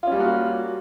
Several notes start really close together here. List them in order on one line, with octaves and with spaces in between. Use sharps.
F4 C#4 G3 A#3 F#4